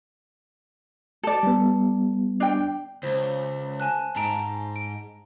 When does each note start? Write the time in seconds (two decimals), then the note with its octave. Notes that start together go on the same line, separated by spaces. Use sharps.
1.23 A4 D5
1.43 G3 B3
2.40 D4 G5
3.03 C#2 C5
3.80 G#5 A5 F#6
4.16 G#2 A5 A#5 D7
4.76 D7